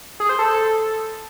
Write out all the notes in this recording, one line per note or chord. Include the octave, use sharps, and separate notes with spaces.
G#4
C5
A4